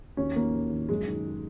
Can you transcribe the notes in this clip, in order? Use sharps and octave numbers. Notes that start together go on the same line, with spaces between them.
D#2 C#4
D#3 A#3
D#2
D#3
F#2 G#3
D#3